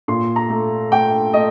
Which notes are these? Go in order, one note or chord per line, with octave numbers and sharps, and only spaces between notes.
A#2 C6
A#5
A3
A3 G5
A3 D#5